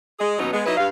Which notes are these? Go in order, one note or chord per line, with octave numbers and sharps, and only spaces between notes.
G#3 G#4 D#5
D#2 B2 F#3 B3 C#4 D#4
G#3 B3
F#3 D#4 E4 B4 D#5
G2 F5